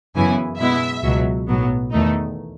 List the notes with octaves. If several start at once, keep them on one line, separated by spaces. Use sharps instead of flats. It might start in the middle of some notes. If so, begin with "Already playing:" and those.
F#2 C#3 E3 B3 E4 G#5
B2 G#3 B3 E4 E5
C#2 B2 F#3
B1 A2 F#3 B3
E2 D#3 A3 D#4